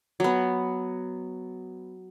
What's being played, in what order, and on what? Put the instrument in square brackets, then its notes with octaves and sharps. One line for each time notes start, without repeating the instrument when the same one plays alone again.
[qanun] F#3 B3